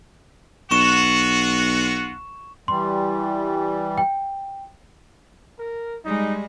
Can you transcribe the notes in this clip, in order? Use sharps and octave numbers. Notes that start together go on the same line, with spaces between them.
B1 F4 F#4 C#6 E7
E3 G3 C6
G5
A#4
G3 G#3 D#4